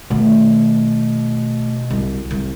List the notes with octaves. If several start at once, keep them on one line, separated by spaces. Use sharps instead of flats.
B2 D#3 A3
C2
C2